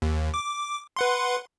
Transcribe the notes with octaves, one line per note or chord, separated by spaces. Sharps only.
D#2
D6
B4 F#5 C6